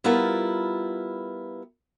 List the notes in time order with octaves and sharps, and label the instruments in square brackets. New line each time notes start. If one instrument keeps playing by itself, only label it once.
[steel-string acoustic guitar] G3 B3 E4 F4 A#4 B4